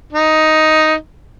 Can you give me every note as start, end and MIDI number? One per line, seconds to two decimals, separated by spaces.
0.12 0.94 63